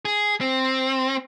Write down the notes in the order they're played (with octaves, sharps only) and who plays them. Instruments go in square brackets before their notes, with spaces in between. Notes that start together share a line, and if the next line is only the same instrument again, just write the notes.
[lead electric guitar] G#4
C4